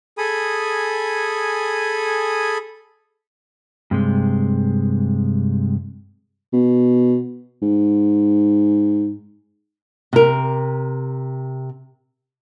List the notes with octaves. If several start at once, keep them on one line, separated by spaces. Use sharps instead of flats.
G#4 A4 G#5 B5 D#6
G2 C3 G#3
B2
G#2
C3 A#4